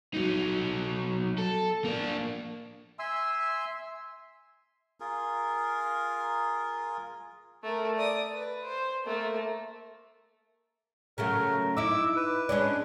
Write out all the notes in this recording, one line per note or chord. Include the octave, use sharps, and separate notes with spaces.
F#3 D#4
A4
A#3 D4
E5 G#5 C6 E6
F4 G#4 A#4
A3 A#4
D5 D#6
B4
C5
A3 A#3
C#3 F#3 A3 A#4
D#4 E4 D6 E6
B4
G#3 C#4 D4